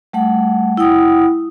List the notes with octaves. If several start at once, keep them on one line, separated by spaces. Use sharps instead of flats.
G3 A3 F#5
E4 F#5 G5 D#6